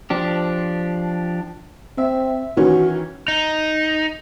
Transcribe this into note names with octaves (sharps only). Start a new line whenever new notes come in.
F3 D4 G4
C4 E5
D#3 E3 C#4 F#4
D#4